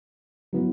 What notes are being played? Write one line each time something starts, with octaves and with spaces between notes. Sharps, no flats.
F#3 B3 E4